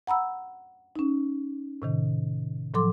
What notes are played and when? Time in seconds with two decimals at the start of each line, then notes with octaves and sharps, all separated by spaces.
0.07 F#5 A#5 B5 E6
0.96 C#4 D#4
1.82 A2 C3 D#3
2.74 A2 F3 F#3 A4 C6 D6